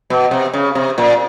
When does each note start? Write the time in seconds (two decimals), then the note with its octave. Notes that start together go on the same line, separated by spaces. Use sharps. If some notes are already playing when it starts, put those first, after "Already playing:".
0.10 B2
0.31 C3
0.53 C#3
0.75 C3
0.98 A#2